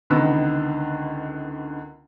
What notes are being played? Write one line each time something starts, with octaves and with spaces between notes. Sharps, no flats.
C#2 D3 D#3 B3 A#5 E6